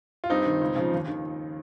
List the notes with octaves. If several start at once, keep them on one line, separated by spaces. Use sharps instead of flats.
F4
G2 C4 D#4
D#3
C#2
C#3 F3
D#2
D#3